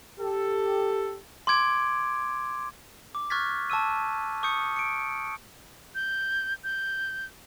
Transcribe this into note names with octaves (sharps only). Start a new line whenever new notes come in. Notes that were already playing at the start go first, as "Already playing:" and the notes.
G4 A4
C6 D6 G#6 D7
D6
C#6 F6 F#6 G#6 A6 B6
A5 C#6 E6 D#7
C#6 D#6 G6 C#7
C#7 D7
G6
G6